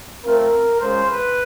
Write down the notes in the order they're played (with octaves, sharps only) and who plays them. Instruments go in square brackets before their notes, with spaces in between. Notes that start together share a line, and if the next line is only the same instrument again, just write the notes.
[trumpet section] A3 C4 F4 A#4
G#3 C#4 F4 C5
B4